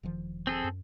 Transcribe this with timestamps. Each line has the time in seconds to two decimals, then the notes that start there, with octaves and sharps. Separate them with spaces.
0.03 E1 D#3 F3
0.47 C4 G#4 A4
0.64 F#2